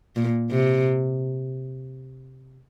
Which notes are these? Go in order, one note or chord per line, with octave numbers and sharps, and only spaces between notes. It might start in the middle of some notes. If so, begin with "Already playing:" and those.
A#2
C3